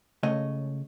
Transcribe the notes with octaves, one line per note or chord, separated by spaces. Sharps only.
C#2 C#3 A3 C#5 D#5